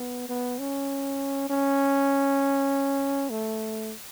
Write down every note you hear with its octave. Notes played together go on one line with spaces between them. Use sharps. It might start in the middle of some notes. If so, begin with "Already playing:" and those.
Already playing: B3
B3
C#4
C#4
A3